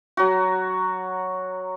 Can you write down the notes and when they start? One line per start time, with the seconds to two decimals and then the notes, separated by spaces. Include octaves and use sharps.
0.17 F#3 F#4